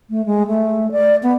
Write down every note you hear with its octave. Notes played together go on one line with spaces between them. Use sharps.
A3
G#3
A3
D5
B3